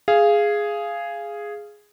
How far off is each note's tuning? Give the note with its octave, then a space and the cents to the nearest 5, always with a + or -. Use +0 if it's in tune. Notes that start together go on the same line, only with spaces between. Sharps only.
G#4 +0 F5 -15